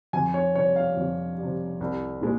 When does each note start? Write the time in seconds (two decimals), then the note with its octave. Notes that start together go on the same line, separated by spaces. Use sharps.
0.13 F2 G#5
0.34 C#5
0.55 C3 G3 C#5
0.76 F5
0.97 F2
1.38 G3
1.43 C3
1.81 C2
2.21 A#2 G#3